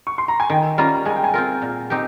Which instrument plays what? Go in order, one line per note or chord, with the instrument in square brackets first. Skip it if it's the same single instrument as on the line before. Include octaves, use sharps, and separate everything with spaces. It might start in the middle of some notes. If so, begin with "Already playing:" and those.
[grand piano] C#6
C6
A#5
G#5
[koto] D#3 [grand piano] G5
[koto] G3 C#4 F4 [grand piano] A#5
[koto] G#3 [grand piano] G#5
[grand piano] G5
G#5
[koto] C4 F4 A#4
A#2
C4 D#4 G4